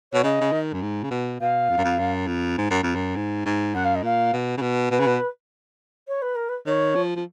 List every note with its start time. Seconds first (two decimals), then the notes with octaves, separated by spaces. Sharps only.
0.13 B2 C#5
0.23 C#3 D#5
0.41 C#3
0.52 D#3
0.73 F#2
0.82 G#2
1.03 C#3
1.11 B2
1.40 B2 F5
1.69 F2
1.78 F#2
1.85 F2
1.99 F#2
2.28 F2
2.58 G#2
2.70 F#2
2.83 F2
2.95 F#2
3.16 G#2
3.46 G#2
3.74 F#2 F#5
3.84 F5
3.95 D#5
4.03 A#2 F5
4.33 B2
4.58 C#3
4.62 B2
4.91 B2 B4
5.00 C#3
5.07 B2
6.08 C#5
6.22 B4
6.35 A#4
6.49 B4
6.66 D#3 C#5
6.95 F3
7.16 F3